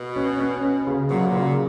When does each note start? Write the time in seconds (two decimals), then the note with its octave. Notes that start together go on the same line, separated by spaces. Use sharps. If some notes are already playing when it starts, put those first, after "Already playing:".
Already playing: B2
0.16 C#4
0.40 C#4
0.63 C#4
0.87 C#3
1.10 A#2 F#3
1.19 B2
1.27 A#2
1.34 C#3